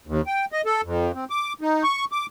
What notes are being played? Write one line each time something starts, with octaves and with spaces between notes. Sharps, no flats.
D#2
G5
D#5
A4
F2
C4
D6
D#4
C#6
D6